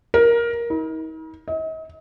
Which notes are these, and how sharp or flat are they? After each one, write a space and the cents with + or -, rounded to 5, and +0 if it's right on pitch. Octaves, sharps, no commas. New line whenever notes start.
A#4 +15
D#4 +45
D#5 +40